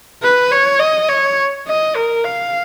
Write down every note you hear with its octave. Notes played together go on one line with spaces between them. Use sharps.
B4
C#5
D#5
C#5
D#5
A#4
F5